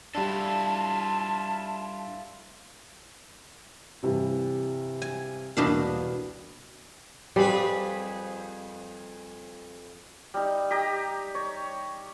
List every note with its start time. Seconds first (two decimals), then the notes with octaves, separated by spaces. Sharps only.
0.15 G3 D4 E4 F4 A4 A5
4.03 G2 C3 E3
5.02 G#5
5.57 E1 C2 B2 A#3 D4 F5
7.36 F2 G3 G#4 B4
10.34 G3 D#4
10.71 G4 D#5 A#5
11.35 C#5